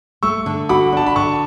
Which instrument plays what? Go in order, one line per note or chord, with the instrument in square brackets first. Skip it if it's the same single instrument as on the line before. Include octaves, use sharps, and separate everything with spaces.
[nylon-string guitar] A3 [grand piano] C#6 E6
[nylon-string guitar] D3
[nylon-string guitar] F#4 [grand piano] B5 D6
[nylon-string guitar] D4 [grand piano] A5
[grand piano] B5
[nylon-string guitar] D3 [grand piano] A5 C#6